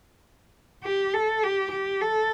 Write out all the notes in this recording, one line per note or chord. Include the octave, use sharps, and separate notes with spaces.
G4
A4
G4
G4
A4